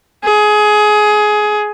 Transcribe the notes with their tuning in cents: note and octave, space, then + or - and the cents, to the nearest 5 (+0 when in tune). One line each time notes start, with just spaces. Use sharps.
G#4 +20